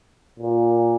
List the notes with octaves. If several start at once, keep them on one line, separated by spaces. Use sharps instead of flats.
A#2